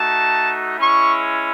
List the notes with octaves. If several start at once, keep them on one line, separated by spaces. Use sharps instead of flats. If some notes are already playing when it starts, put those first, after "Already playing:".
Already playing: A3 D#4 F#4 A5
G#3 C#4 E4 C#6